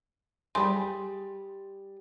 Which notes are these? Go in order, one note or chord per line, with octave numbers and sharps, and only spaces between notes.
G3 G#4 G#5 C6